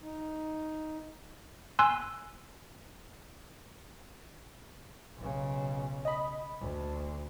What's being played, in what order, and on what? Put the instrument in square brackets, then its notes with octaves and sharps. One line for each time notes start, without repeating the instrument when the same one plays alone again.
[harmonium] D#4
[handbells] G#5 C6 E6 F#6
[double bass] B1 C#3
[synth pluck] D#5 B5
[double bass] D2